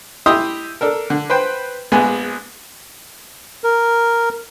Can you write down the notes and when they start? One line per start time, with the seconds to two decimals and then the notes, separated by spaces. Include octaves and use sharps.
0.26 E4 G4 D#5 E5 C6 D#6
0.81 D4 A4 A#4
1.10 D3
1.30 B4 C5 G5
1.92 A#1 G#3 B3 G#5
3.64 A#4